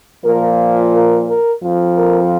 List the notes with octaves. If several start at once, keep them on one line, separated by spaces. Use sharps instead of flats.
A#2 F3 A#4
A#4
A#4
F2 F3
A#4